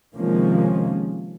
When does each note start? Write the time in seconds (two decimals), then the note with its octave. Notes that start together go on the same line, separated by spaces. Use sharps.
0.15 C3 D#3 F3 G#3 A#3 C#4